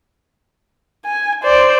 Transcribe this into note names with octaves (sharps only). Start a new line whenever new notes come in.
G#5
C5 D5